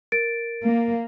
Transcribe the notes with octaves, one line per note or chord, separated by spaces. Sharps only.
A#4 A6 D7
A#3